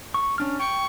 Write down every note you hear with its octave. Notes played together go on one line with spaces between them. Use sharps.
C#6
C#4 D4 F6
G5 C#6